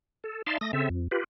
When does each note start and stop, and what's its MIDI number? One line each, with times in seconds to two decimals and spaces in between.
0.24 0.42 69
0.47 0.58 63
0.47 0.58 74
0.47 0.58 76
0.47 0.58 77
0.47 0.58 81
0.47 0.58 84
0.61 0.72 57
0.61 0.72 87
0.61 0.72 94
0.73 0.89 49
0.73 0.89 60
0.73 0.89 69
0.73 0.89 76
0.90 1.08 41
1.11 1.24 65
1.11 1.24 67
1.11 1.24 71